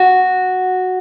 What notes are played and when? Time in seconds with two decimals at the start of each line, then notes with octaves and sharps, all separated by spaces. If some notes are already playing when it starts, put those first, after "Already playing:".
Already playing: F#4